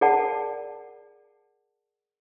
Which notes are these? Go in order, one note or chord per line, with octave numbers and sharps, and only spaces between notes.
G#4 A#4 D5 F#5 A5